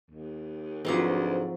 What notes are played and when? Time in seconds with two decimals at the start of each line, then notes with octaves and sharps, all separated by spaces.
0.11 D#2
0.85 D2 G#2 F3 F#3 C4 A4 B4 D6